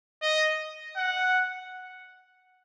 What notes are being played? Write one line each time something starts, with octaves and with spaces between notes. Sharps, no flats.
D#5
F#5